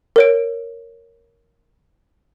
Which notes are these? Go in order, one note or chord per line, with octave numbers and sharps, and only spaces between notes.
A#4 C#5 D7